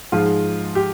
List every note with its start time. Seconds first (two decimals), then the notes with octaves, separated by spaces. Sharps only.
0.12 G#2 F3 G#3 F4
0.75 G4